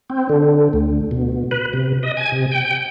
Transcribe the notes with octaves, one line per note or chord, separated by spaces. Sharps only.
C4
D3
D2
B2
B4
C3
D#5
G#5
C3
G5